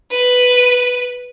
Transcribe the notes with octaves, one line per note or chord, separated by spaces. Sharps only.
B4